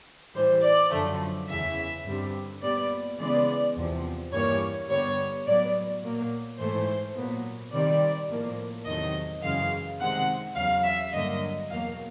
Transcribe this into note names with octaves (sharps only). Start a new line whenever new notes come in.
A2 E3 G3 C5
D5
F#2 D3 F3 A3
E2 C#3 E3 E5
G2 D3 G3 C4
A#2 G3 B3 D5
C#3 E3 G#3 B3 D5
E2 C3 F3
G2 E3 G3 A#3 C#5
G2 D3 G3 B3 C#5
A2 F#3 B3 D5
A#2 F#3 A#3
G#2 E3 A3 C5
A#2 F#3 B3
C3 D#3 G3 C4 D5
A2 F3 A#3
E2 C3 D#3 F#3 A3 D#5
F#2 C#3 E3 G#3 F5
C3 D#3 G#3 C4 F#5
E2 C#3 F#3 F5
E5
G2 D3 F#3 A#3 D#5
E2 B2 F#3 A#3 F5